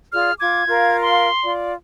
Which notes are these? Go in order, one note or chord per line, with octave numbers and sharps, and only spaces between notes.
F4 G#4 D5 F6
F4 D6 G#6
F4 A#4 F5
C6
F4 D5